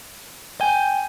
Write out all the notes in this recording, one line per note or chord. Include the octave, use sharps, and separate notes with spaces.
G5 G#5 G6